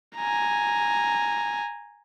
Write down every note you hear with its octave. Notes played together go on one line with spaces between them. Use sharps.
G#5 A#5